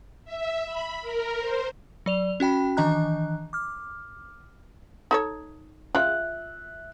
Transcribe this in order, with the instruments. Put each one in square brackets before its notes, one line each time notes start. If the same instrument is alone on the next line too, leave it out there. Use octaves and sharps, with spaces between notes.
[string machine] E5
B5
A#4
C5
[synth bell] F#3 D5 F7
C#4 F#4 G5 B5
D#3 E3 D4 D#5 A#5 F#6
D6 F6
[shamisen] D#4 A4 C#5
[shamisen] F4 G5 [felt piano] E5 F#6